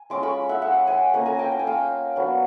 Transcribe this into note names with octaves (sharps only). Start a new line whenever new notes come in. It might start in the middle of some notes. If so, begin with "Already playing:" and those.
Already playing: G#5
G#3 C#4 F4 C6 D6
B5 C#6
E5 F#5
E5 F#5
F#5 G#5
A#3 C#4 F4 G#5 A#5
G#5 A#5
G5 A5
G5
G#5
F5 G5
F#3 B3 D4